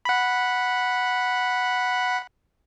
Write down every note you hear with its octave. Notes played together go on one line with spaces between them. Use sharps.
F#5 B5